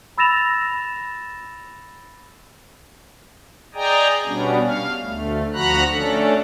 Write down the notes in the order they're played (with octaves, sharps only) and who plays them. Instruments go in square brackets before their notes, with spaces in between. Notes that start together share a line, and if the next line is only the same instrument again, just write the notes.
[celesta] B5 E6 A6 A#6 E7 F7
[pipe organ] G#4 D5 D#5 G5 G#5 A#5
B2 G3 B3 C#4 D4
F5
D2 A3
D2 F3 F#4 A#5 B5 F#6
A3 C#4 D4 A4